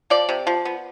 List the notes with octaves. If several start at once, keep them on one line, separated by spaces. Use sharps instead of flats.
F3 D5
C3
F3
B3